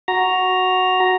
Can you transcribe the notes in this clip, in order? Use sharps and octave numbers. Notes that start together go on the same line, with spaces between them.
F#4 A#5